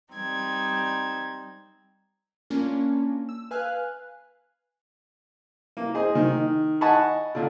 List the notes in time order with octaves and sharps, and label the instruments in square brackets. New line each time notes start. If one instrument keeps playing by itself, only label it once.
[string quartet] G3 C4 D#4 G#6
[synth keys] A#3 C#4 D4 F4
E6
B4 F5 G#5 F6 F#6
[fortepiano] A#3
G#4 C5 D#5
D#3
D#5 F#5 G#5 A5 B5 C#6
A#2 D3